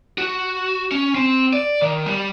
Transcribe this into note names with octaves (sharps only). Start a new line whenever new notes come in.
F#4
C#4
C4
D5
D#3
G3